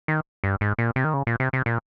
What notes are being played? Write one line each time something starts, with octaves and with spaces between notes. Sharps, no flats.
D#3
G2
G#2
A#2
C3
D#3
C#3
A#2
C3
C3
A#2